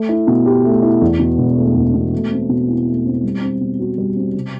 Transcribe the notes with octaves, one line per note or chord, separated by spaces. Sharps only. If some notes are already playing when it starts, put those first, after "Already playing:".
Already playing: A3
E4
B2
G4
A3
E4
E2
B2
E1
A3
E2
B2
A3
C4
B2
E4
A3
C4
G3
C4
B2
F#4
G3
C4
C3